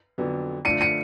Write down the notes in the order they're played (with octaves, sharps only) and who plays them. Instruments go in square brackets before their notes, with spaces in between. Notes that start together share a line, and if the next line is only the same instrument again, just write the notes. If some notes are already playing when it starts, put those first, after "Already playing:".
[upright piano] F2 D3 F#3 B3
[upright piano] D3 F3 A3 D4 F4 [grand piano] C#7 D#7
[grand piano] C#7 D#7